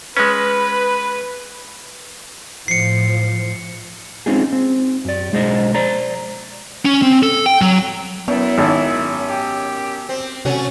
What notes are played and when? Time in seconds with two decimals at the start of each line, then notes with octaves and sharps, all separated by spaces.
0.17 G#3 C#4 B4
2.68 A2 F3 C7 C#7
4.26 G#3 C4 C#4 D#4 F4 G#4
4.53 C4
5.05 F#2 D5
5.33 B1 G#3 G#4 C5 D5 D#5
5.74 C5 D5 A#5
6.85 C#4
7.02 C4
7.23 A4
7.46 G5
7.62 F#3
8.28 F#2 B3 E4
8.58 G#1
9.28 G4
10.09 C4
10.45 C3 F#3 A3 C#4 F#4